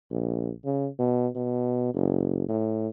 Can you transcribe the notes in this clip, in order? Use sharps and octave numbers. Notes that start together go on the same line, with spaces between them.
A#1
C#3
B2
B2
F#1
A2